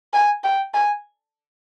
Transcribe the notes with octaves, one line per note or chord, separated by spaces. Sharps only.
G#5
G5
G#5